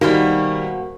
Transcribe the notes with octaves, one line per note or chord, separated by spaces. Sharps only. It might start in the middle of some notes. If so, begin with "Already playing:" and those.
B2 D#3 G3 A#3 F#4 C5